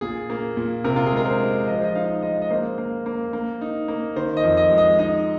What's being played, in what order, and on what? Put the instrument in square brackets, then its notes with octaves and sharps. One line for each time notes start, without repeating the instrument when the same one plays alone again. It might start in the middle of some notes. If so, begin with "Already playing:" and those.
[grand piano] A#2 G#4
A#3
A#2
C3 A#4
F4
G#4
G#3 A#4
C5
G#3
F3 D#5
C5
D#5
D#4 F5
G#3 D#5
D#5
A#3 C5
A#3
A#3
A#3
D#4
A#3
D#3 C5
D#5
F2
D#5
G#3
D#5
D#4 D#5